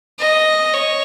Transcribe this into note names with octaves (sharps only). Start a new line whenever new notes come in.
D#5
C#5